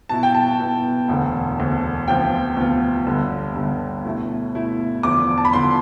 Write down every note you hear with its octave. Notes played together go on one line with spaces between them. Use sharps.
B2 B3 E4 A5
G5
A5
B2 B3 E4
E1 D2 D3
E1 D2 D3
D2 C3 F3 B3 F4 G5
D2 C3 F3 B3 F4
G1 G2 D3
G1 G2 D3
B2 A3 E4
B2 A3 E4
E2 D3 F3 D6
A5
B5
E2 D3 F3 C6